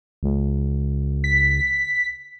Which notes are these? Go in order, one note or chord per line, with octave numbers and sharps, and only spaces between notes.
C#2
B6